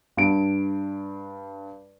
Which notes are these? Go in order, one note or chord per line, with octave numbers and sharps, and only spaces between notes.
G2 D7